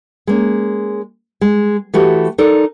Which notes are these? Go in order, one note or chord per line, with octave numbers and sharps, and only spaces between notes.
G#3 A#3 C#4
G#3
E3 A3 F#4 G4
D#4 A4 A#4 D5